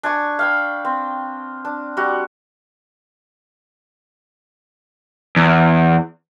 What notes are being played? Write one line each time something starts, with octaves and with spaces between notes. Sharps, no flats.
D4 G#5 C#6
F5 G5 B5
C4
D4
G3 F#4
E2